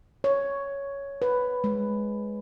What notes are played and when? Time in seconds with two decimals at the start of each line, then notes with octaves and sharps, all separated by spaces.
0.24 C#5
1.22 B4
1.64 G#3